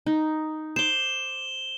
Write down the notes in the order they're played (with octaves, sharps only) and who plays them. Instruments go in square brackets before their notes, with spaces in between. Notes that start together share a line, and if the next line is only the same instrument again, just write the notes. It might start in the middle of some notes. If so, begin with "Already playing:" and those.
[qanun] D#4
[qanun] C5 D6 [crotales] E7 G7